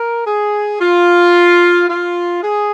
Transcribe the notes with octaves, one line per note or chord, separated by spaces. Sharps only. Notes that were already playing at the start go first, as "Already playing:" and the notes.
Already playing: A#4
G#4
F4
F4
G#4